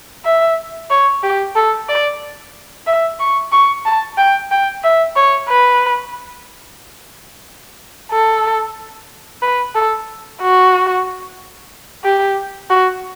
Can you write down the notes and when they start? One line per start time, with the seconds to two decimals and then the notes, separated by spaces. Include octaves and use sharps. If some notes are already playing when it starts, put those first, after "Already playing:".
0.25 E5
0.90 C#5
1.23 G4
1.55 A4
1.89 D5
2.87 E5
3.20 C#6
3.52 C#6
3.85 A5
4.18 G5
4.51 G5
4.84 E5
5.16 C#5
5.49 B4
8.11 A4
9.42 B4
9.75 A4
10.41 F#4
12.04 G4
12.70 F#4